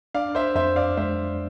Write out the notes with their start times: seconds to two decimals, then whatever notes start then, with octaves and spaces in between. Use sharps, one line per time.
0.14 D4 D5 F5
0.35 C5 E5
0.55 F2 C5 E5
0.76 D5 F5
0.97 G#3 C5 E5